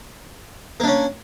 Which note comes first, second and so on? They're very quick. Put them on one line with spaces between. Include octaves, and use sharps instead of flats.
A#3 D4 C#4